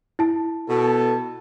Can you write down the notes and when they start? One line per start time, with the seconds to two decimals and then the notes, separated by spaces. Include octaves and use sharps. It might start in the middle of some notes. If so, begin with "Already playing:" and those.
0.19 E4 A5
0.69 B2 A4